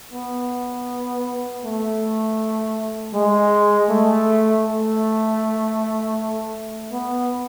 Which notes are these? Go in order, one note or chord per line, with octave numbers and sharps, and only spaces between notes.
B3
A3
G#3
A3
A3
B3